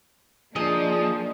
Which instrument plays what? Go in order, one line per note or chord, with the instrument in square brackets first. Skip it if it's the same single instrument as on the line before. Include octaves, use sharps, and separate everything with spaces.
[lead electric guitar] F3 [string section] A#3 D4 D#4 [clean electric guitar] G#4 [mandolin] D#5